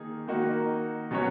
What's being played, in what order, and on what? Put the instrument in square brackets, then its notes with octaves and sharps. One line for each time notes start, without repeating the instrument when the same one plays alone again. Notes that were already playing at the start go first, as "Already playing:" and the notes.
Already playing: [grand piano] D#3 A#3 D#4 G#4
D#3 A#3 D#4 F#4
B2 F#3 C#4 F#4 C#5